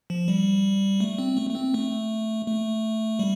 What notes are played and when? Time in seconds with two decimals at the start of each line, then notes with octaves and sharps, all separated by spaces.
0.10 F3
0.28 G3
1.00 A3
1.18 C4
1.37 A3
1.50 A3
1.55 C4
1.74 A3
2.47 A3
3.19 G3